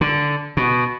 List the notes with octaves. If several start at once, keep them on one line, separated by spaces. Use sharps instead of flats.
D3
B2